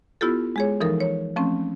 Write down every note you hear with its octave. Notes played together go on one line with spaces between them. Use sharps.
B3 E4 F4 G4 A4
G#3 G#4 C#5
E3 F3 D#4 A4 A#4
C#5
F3 A3 C4 C#4